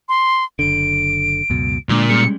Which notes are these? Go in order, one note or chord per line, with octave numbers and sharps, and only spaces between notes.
C6
F#1 D3 D7
C#2 F#2 B2
A#2 D3 G#3 D4
G3 G#3 C#4 C#7